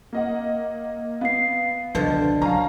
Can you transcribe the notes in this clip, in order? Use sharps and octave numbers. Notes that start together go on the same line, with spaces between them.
A#3 D#5 F#5
B3 F5 C7
C#2 B2 D3 F3 A5
F#3 C#4 F5 A5 A#5